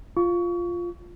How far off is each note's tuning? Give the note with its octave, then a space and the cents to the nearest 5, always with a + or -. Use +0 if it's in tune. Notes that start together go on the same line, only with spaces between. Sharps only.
F4 +0 C#6 +25